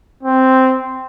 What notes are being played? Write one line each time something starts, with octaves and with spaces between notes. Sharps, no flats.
C4